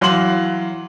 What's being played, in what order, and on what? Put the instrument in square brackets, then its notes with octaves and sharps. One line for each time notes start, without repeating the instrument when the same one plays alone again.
[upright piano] E3 F#3 F5 C6 F#7